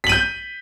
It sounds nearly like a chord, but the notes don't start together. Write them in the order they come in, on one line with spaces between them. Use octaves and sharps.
B6 F#7 D#7 G6